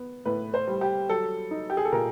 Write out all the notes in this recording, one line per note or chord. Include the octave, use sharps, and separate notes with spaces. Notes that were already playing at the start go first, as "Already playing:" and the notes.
Already playing: B3
A2 B4
C5
G3
G4
F#3 A4
D#4
G4
G#4
A4
A#2 A#4